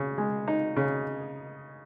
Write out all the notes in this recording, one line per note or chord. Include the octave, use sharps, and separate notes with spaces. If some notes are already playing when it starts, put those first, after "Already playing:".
Already playing: C#3
G#3
D#4
C#3